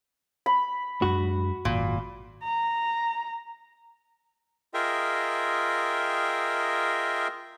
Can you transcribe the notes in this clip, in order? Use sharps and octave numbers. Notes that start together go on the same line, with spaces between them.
B5
F#2 G#3 D4 F#4
G#1 F#2 A#2
A#5
F4 G#4 A#4 D#5 E5 G5